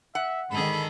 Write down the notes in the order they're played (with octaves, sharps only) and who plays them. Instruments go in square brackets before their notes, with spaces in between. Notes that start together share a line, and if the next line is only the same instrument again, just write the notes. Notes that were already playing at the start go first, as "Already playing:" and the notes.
[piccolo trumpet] E5 [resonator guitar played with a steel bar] F#5
[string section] G#2 D3 D#3 [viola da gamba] G#4 A4 [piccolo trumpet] B5